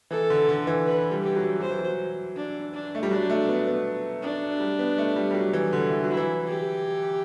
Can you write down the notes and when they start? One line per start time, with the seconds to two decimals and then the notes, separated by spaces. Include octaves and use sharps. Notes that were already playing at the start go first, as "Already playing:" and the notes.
0.11 E3 A4
0.30 D3
0.49 D3
0.67 E3
0.85 B4
1.11 G3
1.23 G4
1.36 F#3
1.60 F#3 C5
1.71 E3
1.79 F#3
2.36 D4
2.74 D4
2.95 A3
3.03 G3
3.11 F#3 D4
3.30 A3
3.48 B3
3.67 B3
4.22 D4
4.60 G3
4.79 B3
4.98 A3
5.16 G3
5.31 G3
5.34 F#3
5.53 E3
5.73 D3
5.91 E3
6.04 F#3
6.10 E4
6.17 E3
6.47 G4